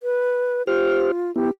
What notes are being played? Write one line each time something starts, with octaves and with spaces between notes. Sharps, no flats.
B4
F4 G4 C5 F6
B3 E4 G4